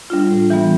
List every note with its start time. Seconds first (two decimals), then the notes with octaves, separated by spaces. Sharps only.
0.10 G3 D4 F4
0.30 A2
0.50 E3 G3 B3